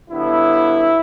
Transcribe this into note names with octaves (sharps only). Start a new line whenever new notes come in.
G2 D3 F#3 B3 E4